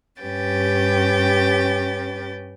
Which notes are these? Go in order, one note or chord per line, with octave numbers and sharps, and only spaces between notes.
G2 C#4 G4 B4 G5 A6